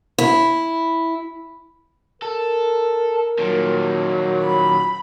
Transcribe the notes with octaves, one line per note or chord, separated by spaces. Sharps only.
E4
A4 A#4
A#2 D#3 F#3
B5